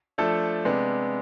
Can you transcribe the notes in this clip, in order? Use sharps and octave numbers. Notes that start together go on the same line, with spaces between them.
F3 A3 D4 A4
C3 G#3 B3 D4